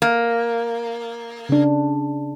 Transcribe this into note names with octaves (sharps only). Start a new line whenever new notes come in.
A#3
C#3 D4